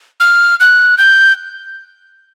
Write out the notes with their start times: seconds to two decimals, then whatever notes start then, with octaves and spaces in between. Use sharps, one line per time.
0.20 F6
0.60 F#6
0.98 G6